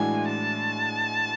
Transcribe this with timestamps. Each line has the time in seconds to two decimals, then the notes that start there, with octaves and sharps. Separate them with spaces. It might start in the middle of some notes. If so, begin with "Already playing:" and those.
Already playing: A2 E3 G#3 D4 F#4 G#5
0.28 A5